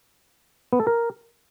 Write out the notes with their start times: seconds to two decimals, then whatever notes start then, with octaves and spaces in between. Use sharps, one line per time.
0.73 B3
0.80 A4
0.87 A#4